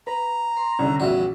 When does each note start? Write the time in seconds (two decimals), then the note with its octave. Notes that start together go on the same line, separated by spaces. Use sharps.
0.07 B4 A#5
0.57 C6
0.79 C2 D3 C#4
1.00 A#1 E2 G2 F#4 E5